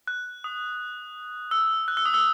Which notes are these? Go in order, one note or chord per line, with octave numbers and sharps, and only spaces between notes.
F#6
D#6
E6
F#6
E6
D#6
E6